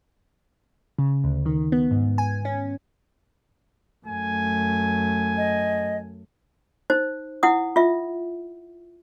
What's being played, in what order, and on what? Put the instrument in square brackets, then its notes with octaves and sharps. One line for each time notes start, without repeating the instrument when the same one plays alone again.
[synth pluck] C#3
D2
D#3
B3
G#2
G#5
C#4
[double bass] F#2 A3 [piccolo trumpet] G#5
[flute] D#5
[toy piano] D#4 C5
E4 F#5 D#6
F4 E5